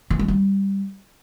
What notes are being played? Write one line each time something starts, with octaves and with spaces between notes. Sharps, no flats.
E3
G#3
G3